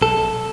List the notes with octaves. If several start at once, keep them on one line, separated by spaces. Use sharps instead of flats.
B1 A4
B1